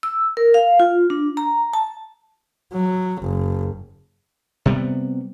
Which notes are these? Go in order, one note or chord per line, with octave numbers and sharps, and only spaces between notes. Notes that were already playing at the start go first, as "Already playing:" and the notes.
E6
A#4
F5
F4
D4
A#5
A5
F#3
F#1
C3 G3 B3